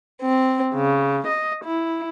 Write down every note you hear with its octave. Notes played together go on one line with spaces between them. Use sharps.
C4
C#3
D#5
E4